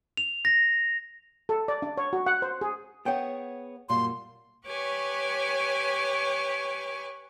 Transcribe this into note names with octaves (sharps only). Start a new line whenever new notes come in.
F7
A#6
A4
D5
D4
C#5
F#4
F#5
C5
G#4
B3 G#4 C#5 F#5 G5
F#2 A#2 G3 C6
G4 B4 C#5 G#5 C#6 D6